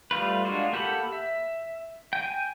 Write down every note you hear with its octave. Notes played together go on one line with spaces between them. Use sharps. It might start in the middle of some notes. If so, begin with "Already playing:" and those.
G3 A3 F4 B4
G#3 A#3 D4 F4 F#4
A#3 G4 A4 F#5 B5
E5
G5 G#5